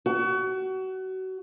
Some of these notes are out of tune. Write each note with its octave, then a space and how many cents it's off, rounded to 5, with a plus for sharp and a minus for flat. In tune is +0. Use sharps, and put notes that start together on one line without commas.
F#4 +30